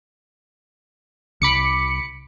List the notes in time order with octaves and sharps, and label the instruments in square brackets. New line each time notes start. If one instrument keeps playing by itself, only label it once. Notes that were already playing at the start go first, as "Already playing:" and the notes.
[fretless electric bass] C2 [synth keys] B5 D6 C#7